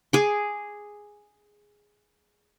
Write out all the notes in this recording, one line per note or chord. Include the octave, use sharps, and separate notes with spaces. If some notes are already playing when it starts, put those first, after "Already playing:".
G#4 D6